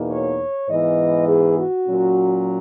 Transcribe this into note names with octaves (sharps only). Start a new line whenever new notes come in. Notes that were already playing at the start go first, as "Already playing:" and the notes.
Already playing: E2 B2 A#3 D#4
C#5
G#2 E3 B3 D#5
G#4
F#4
A#2 F#3 C#4